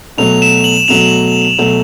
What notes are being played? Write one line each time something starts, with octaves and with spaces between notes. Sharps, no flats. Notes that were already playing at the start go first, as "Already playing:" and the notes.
B2 F#3 A3 F7
E7
F#7
B2 F#3 A3 F7
B2 F#3 A3